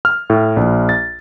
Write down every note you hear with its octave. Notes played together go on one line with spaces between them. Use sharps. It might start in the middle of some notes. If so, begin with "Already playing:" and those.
F6
A2
A#1
A6